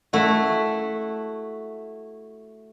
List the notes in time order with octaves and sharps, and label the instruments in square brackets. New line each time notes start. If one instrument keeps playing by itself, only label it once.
[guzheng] A3 E4 F#4